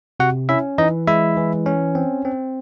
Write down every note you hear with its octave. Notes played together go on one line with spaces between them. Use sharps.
C3 F#4 F#5
C#4 E4 E5
E3 D#4 D#5
G#3 E4 E5
E3
C#4
C4
C4